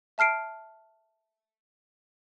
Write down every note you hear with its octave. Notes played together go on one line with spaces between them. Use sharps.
E5 A5 F6 C7 D7